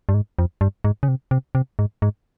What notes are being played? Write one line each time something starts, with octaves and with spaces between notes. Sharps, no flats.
G2
G#2
F2
G2
G#2
C#3
C3
C3
C3
G#2
G#2